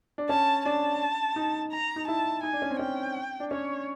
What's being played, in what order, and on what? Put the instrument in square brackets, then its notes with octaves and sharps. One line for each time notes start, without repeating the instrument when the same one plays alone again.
[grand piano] D4
[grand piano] C#4 [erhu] A5
[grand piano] D4 [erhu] A5
[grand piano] D#4
[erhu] A#5
[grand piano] D#4
[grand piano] E4 [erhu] A5
[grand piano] D#4 [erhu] G#5
[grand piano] D4
C#4
C4
[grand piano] C#4 [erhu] G5
[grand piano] D4
[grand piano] C#4 [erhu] C#5